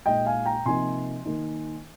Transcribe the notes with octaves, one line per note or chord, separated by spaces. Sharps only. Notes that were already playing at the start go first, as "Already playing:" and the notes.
A#2 G#3 D#4 D#5 G5
F5 G#5
G5 A#5
C3 F3 A#3 D#4 G#5 C6
D#3 A#3 D#4